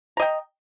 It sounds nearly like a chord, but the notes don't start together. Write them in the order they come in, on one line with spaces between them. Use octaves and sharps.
A#5 D#5 G5